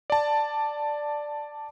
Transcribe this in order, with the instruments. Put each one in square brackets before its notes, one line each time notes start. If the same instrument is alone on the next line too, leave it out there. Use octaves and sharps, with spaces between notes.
[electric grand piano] D5 A5